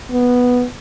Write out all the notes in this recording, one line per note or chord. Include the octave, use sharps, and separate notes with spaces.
B3